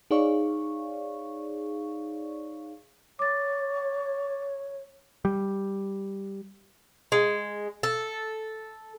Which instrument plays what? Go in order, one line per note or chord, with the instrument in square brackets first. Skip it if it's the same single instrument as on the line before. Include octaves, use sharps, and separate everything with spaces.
[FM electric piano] D#4 G#4 C#5 D5 F5 C#6
[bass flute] C#5 [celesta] D6 A6
[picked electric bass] G3
[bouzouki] G#3
A4